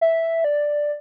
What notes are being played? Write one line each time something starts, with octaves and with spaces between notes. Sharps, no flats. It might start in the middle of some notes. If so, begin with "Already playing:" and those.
E5
D5